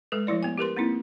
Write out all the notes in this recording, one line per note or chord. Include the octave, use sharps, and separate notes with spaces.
G#3 A4 B4
F3 A3 E4 D5
B3 G#5
G4 A#4 B4 C6
A#3 C4 D#4 E4